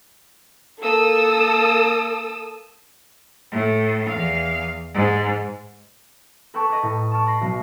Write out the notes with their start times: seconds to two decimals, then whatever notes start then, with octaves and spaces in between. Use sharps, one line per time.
0.80 A#3 A4 D#6 E6
3.52 A2
4.09 E2 F5
4.95 G#2
6.54 A4 B4 G5 A5 C#6 D6
6.69 B4 C#5 D#5 A#5
6.83 A2
7.11 A5 C#6 F6 D7
7.26 B5 A#6 C7
7.41 B1